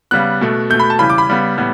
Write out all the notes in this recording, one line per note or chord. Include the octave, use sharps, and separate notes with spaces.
C#3 G3 B3 F#6
B2 A3
B2 A3 G6
B5
A5
C#3 E3 G3 B5
D6
B5
C#3 G3 B3
A2 E3 G3 B3